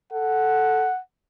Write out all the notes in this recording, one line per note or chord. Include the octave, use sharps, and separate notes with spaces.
A4 F#5